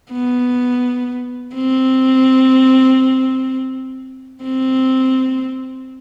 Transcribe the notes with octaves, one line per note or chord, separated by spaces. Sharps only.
B3
C4
C4